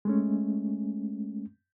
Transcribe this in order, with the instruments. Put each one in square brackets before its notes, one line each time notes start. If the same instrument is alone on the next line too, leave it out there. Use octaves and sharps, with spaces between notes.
[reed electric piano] G#3 A3 C#4